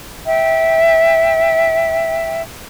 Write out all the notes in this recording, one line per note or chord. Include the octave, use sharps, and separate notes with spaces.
E5 G5